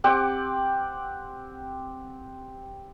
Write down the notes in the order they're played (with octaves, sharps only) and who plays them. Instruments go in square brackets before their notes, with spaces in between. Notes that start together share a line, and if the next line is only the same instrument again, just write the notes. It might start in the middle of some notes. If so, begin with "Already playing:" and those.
[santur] C4 G4 F#5 D6